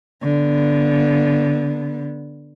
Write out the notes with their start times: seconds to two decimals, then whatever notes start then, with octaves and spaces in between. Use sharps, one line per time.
0.23 D3 B3